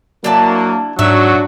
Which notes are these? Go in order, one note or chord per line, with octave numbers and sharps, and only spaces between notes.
F#3 A#3 D4 E4 A5
G#2 F#3 D4 F#4 E5